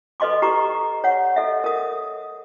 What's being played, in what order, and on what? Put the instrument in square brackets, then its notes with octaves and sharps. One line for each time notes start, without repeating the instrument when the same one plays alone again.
[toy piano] A4 B4 D#5 C6 D6
G4 A#5 C#6 D6
C#5 F#5
A4 D#5 E5
A#4 D#6